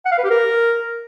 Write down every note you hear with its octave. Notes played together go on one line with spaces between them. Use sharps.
F#5
F5
B4
G4
A#4